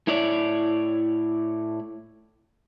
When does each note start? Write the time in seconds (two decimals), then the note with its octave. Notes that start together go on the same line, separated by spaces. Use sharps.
0.07 A2 E4 C#5 D5